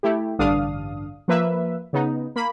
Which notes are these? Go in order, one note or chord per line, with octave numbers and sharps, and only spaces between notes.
A3 E4 G4
A1 G2 D3 D4 F5 D#6
F3 A#3 B4 E5
C#3 B3 D#4
A#3 B5